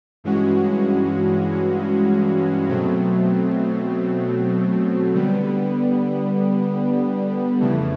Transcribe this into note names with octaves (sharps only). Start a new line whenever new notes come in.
G2 E3 G#3 C#4 F#4
B2 F#3 A3 C4
D3 G3 B3
F2 C#3 E3 A3